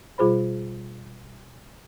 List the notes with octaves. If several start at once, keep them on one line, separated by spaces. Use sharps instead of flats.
B2 G3 F4 G#4 C5 B5